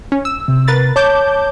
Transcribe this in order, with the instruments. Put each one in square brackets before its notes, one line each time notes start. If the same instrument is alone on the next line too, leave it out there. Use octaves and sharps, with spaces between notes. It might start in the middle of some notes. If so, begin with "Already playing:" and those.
[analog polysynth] C#4
E6
[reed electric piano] C3
[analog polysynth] A#4 B4 A6
[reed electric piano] C#5 [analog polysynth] A5 D6 G6